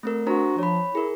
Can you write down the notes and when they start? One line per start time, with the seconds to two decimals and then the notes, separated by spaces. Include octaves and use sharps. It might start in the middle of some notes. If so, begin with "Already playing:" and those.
0.03 A3 C4 A#4
0.27 D4 F#4 C5 A#5
0.58 F3 C#5 B5
0.95 E4 G#4 A#4